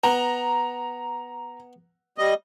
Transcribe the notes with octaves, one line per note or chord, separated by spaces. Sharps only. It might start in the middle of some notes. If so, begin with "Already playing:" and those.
B3 A#5
G3 D#5